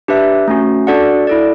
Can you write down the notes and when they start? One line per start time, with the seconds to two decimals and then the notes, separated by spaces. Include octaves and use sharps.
0.08 D4 G4 B4 E5
0.48 A3 C#4 F#4
0.87 D4 F#4 A4 D5 F#5
1.27 E4 A4 D5